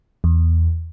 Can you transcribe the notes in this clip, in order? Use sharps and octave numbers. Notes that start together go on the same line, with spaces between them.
E2